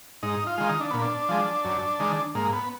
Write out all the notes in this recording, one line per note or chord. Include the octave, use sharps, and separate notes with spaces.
G#2 D#4
F4
D#3 G#3
D#4
D4
A#2 B3
D4
F3 G#3
F#2
D#3 G#3
G#2 A#3
B3